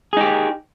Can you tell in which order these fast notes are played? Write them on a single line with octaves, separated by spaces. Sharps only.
G#4 D#4 G4